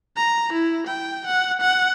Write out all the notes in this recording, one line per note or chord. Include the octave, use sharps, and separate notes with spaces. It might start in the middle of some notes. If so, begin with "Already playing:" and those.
A#5
E4
G5
F#5
F#5